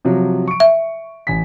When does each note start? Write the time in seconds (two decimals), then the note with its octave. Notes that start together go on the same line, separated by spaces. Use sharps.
0.05 C3 F3 F#3
0.48 C#6 D7
0.60 E5
1.27 A1 G#5 B6